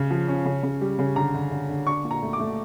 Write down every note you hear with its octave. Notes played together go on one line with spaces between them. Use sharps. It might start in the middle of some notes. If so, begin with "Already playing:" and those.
Already playing: C#3 C#4
F3
C#4
C#3
C#3
G3
C#3
D3 A#5
D3
D3
D3
D4 C#6
A#2
A#5
A3
D6
A3